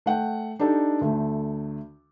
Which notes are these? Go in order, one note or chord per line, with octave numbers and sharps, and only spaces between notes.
A3 F#5 G5
D4 D#4 G4 A4 D5
D2 A3